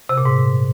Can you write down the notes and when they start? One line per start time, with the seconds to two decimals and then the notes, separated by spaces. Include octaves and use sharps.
0.09 C3
0.17 A#2
0.25 G#2